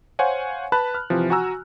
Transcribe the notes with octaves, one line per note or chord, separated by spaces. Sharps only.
C5 C#5 F5 F#5 G#5
B4 A5 B5 F#6
F6
C3 E3 F3
F#4 G#5 A#5 E6